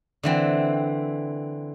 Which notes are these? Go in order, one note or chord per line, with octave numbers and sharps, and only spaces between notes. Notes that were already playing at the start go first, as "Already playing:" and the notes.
D3 E3 C4